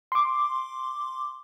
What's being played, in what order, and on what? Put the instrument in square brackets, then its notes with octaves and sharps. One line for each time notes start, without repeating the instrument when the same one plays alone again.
[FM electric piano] C6 D6